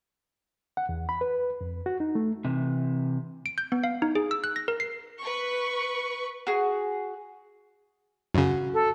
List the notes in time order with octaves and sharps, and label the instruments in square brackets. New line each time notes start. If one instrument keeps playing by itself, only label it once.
[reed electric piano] F#5
E2
B5
B4
F2
F#4
D#4
A3
[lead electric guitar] C3 E3
[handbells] D7
G6
B3
F5
D#4
G#4
E6
F#6
A#6
A#4
C7
[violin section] B4 C#6
[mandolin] F#4 G#4
[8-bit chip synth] F#2 C#3 [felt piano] F#4
[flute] A4